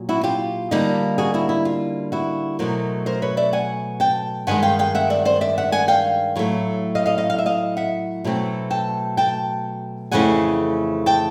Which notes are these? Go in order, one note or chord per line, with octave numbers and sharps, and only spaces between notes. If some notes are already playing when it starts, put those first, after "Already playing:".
Already playing: A#2 F#3
E4 F#4
F4 G4
D3 G3 A#3 D#4
F#4 G#4
E4 F#4
E4
F4
E4 F#4
B2 F#3 A3 A#4 C5
A#4 C5
B4 C#5
D5 E5
F#5 G#5
G5 A5
G2 D#3 G#3 F#5 G#5
F5 G5
F5 G5
E5 F#5
D5 E5
C5 D5
D5 E5
E5 F#5
F#5 G#5
F5 G5
A2 F#3 A3
D#5 F5
D#5 F5
D#5 F5
F5
E5
D#5 F5
E5 F#5
B2 F#3 A3 C4
G5 A5
G5 A5
F2 C#3 E3 A3 C4 F#5 G#5
G5 A5